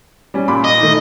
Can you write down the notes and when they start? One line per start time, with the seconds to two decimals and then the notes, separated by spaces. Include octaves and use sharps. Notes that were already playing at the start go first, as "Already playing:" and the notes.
0.34 G3 C#4
0.48 A#2 B5 D6
0.64 D#5
0.81 D#3 A3